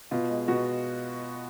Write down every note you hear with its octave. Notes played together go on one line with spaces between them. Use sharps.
B2 F4
G#3
B2 F#4